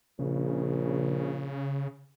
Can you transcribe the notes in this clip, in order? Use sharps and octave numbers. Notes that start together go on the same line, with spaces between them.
A#1 C#3